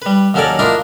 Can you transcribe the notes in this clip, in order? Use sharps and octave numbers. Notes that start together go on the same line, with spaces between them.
G3 B4
D#2 F#3 C#4 A4 A#4 D5
A#3 D4 E4 F4 A#4 D#5